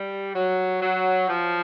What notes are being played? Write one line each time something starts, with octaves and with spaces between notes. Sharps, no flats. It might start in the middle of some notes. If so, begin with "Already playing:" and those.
Already playing: G3
F#3
F#3
F3